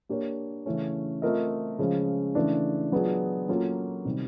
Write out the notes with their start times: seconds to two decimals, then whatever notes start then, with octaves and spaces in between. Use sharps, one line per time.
0.09 A#3 D4 G4 A#4 C#5
0.66 C#3 E3 A3 C#4
1.22 A3 C4 F4 A#4 D#5
1.79 C#3 F3 G#3 C#4
2.35 C#3 E3 A3 D4
2.92 F#3 B3 D4 F4 G#4
3.49 F#3 A#3 C#4 F4 A4
4.05 C3 D#3 G3